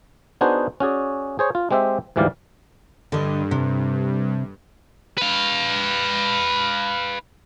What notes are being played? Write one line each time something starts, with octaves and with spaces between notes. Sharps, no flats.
B3 D4 D#4 F#4 G#4 C5
C#4 F#4 G#4 D5
G#4 C5 C#5
F4
G#3 C4 G4 C5 E5
D2 G#2 E3 G3 D5 F5
G2 D3 D#5
C3
B4 F5